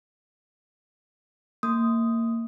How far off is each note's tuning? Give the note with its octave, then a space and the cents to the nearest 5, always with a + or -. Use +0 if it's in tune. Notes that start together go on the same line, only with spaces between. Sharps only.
A#3 -25 D#6 +0